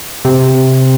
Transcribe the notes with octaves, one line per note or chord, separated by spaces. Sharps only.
C3